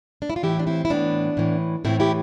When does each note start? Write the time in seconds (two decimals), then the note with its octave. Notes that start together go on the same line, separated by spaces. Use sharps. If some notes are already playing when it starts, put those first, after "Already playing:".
0.22 D4
0.30 E4
0.36 F4
0.43 A2 E3 E4 G4
0.59 D4
0.67 C4 E4
0.85 E4
0.90 A2 E3 B3 D4
1.37 A2 E3
1.85 A2 E3 C4 E4
2.00 E4 G4